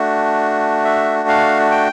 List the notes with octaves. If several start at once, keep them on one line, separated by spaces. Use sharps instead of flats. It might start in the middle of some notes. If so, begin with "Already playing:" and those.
Already playing: A3 D4 F#4
E5
F5
G5